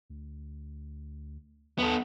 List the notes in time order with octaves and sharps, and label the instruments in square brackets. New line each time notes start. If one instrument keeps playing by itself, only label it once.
[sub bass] D2
[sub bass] D#2 [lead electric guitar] B3 A4